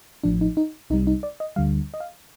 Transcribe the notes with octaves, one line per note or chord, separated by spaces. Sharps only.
A1 A2 F3 D4
D#4
D#4
C2 C3 G3 D#4
D#4
D5
D#5
D2 D3 G3 F5
D#5
F5